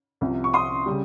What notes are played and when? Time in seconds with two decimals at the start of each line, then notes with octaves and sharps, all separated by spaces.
0.21 C2 C3 F3
0.44 C#6
0.54 C6 D#6
0.86 C#3 G3